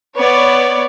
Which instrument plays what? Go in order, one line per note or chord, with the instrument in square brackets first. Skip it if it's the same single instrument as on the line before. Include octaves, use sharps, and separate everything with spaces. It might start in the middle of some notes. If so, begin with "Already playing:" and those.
[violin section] B3 C#5 D5